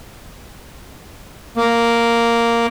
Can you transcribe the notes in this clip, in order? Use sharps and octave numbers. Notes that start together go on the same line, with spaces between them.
A#3